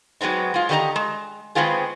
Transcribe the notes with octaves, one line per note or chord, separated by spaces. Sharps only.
F#3 G#3 B3 C4 D#4
G#3 F4
D3 D#3 G4 B4 D#5 A#5
G#3
D#3 G#3 B3 C4 F4 G#4